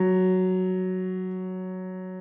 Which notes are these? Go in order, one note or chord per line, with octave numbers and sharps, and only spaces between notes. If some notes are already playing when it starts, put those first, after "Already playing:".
Already playing: F#3